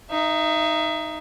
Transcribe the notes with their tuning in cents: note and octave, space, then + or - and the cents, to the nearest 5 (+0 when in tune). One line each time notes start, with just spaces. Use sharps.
D#4 +0 E5 +30